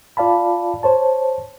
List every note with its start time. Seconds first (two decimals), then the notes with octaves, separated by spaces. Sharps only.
0.17 F4 D5 F5 A5 B5
0.83 C5 C#5 A5